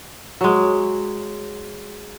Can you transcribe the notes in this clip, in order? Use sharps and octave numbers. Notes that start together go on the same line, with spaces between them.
F#3 G#3